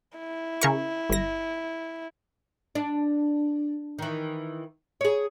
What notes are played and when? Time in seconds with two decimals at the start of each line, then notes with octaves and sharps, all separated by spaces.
0.18 E4
0.61 C#3 A#4 C#6
1.10 G1 A#6
2.75 D4
3.98 D#3 E3
5.01 G#4 C#5